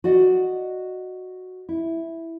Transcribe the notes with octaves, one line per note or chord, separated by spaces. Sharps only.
F#4 D5 D#5 F#5
E4